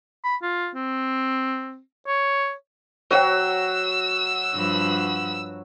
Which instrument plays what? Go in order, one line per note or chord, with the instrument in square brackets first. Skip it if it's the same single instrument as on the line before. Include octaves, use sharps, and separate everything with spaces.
[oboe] B5
F4
C4
C#5
[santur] F#3 F#4 [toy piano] C5 C#5 G5 [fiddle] E6
[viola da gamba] G2 F3 B4